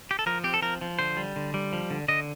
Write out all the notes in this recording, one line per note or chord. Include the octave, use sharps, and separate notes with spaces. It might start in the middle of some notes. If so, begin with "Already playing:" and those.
G4
A4
F3 A#4
C4 G4
A4
F3 A#4
F3
D3 C5
G3
D3
G3
F3
D3
D3 D#5